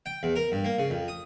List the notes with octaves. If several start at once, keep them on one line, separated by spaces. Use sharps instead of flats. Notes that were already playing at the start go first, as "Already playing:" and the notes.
G5
E2
A#4
G2
A#3
C#3
F2
D#6